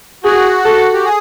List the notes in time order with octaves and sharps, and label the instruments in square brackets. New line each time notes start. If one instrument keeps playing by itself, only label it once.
[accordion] F#4 [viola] G#4
[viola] A4
[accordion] G4
G#4